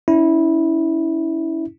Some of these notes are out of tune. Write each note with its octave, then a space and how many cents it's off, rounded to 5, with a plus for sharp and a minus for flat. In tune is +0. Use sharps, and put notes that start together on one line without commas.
C#4 +30 E4 -15